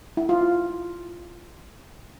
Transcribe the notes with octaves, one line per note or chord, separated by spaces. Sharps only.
E4
F4